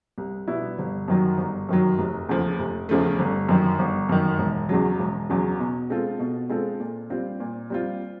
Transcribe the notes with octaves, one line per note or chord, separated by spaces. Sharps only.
C2
B2 G3 B3 E4
G1
F#2 D#3 F#3
G1
F#2 D#3 F#3
F1
E2 C#3 F3 A3
F1
E2 C#3 F3 A3
G1
F#2 D#3
G1
F#2 D#3
E1
E2 C#3 F#3
E1
E2 C#3 F#3
B2
G#3 C4 F4 A4
B2
G#3 C4 F4 A4
A#2
G3 C4 F4
A#2
G3 C4 F4